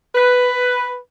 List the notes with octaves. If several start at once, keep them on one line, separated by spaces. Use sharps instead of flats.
B4